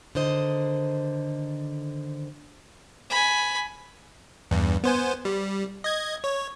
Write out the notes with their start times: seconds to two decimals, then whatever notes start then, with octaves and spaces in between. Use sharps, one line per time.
0.15 D3 D#3 C5 D#5
3.10 G#5 B5
4.51 E2 G2
4.84 B3 C5 G#5
5.25 G3
5.84 D#5 G#6
6.24 C#5